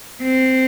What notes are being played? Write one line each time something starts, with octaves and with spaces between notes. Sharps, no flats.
C4